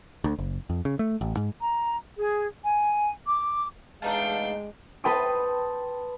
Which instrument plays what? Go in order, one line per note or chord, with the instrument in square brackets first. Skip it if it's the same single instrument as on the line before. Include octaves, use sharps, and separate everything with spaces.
[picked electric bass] D2
F#1
F2
C#3
A3
A1
G#2
[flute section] A#5
G#4
G#5
D6
[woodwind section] E2 F5 [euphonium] G#3 [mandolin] A3 D#4 A5 [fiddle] D4 G5
[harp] B4 G5 A5 C6 D#6 D7